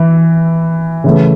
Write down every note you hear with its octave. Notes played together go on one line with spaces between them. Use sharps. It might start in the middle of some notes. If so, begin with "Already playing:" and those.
Already playing: E3
C#3 E3 A3